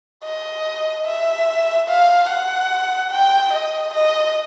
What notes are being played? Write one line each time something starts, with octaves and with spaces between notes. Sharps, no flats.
D#5
E5
F5
F#5
G5
D#5
D#5